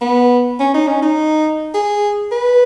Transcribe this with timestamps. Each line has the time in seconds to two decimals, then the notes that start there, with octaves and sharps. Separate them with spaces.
0.01 B3
0.60 C#4
0.74 D#4
0.88 C#4
1.02 D#4
1.74 G#4
2.32 B4